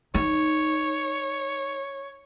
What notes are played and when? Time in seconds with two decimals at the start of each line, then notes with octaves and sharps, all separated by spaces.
0.14 D#4 C#5